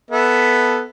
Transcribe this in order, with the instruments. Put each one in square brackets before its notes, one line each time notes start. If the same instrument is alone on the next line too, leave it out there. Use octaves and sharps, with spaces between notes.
[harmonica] B3 A4 E5